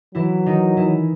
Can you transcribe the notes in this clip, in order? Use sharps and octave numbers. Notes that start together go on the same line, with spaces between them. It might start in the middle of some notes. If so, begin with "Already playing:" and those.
E3 F#3 E4
D#3 D#4
E3 E4